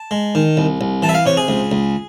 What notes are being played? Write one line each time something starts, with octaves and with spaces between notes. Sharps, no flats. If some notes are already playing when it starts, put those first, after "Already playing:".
Already playing: A5
G#3
D#3
C2
C2
E3 A5
E5
F5
C3 C#5
G#4
C#2
C#2